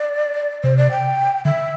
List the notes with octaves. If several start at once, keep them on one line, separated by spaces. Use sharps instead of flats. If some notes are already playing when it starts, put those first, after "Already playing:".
Already playing: D5
C3 C5
D5
G5
D3 E5